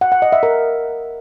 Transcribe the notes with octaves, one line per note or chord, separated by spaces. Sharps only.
F#5
F#5
D#5
E5
A#4